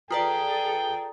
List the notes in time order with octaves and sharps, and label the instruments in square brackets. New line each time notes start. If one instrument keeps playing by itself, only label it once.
[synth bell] F4 B4 D5 [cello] G#4 A4 [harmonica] G5 [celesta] A#5 D#6